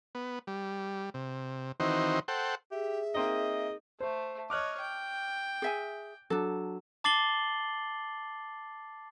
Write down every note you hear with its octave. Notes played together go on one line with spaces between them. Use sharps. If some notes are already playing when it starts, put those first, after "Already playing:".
B3
G3
C3
D#3 E3 C4 D#4 F#4 C5
A4 C5 F#5 G5
G4 G#4 E5
A#3 C4 D#4 D#5
A3 C5
C#5 D#5 D6 F6 F#6
G5
G#4 E5 G#5
F#3 D4 A4
A5 D6 A6 C7 F#7 G7